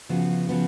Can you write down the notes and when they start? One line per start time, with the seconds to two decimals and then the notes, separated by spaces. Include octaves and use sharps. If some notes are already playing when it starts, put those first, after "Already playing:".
0.09 C#3 F3 B3 F#4
0.48 C#3 F3 B3 F#4